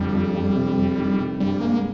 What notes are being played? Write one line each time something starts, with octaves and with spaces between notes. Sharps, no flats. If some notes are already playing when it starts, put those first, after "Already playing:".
Already playing: F2 D3 G3
F2
F2
C3
F2
D#3
C3
G2 G3
G#3 A#3